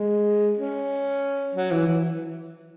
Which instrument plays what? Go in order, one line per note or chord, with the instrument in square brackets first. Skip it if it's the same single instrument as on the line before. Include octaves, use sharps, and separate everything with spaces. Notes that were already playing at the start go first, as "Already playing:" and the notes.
Already playing: [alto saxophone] G#3
C#4
F#3
E3
E3